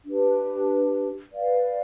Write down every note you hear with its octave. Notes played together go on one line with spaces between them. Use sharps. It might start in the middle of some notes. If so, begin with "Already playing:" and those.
D4 G4 B4
B4 D5 F5